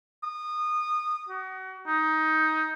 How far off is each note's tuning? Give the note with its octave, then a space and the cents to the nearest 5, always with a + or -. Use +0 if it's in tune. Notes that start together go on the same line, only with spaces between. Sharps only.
D#6 -25
F#4 +30
D#4 +15